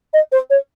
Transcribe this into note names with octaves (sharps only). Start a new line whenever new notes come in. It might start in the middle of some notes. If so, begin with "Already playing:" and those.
D#5
C5
C#5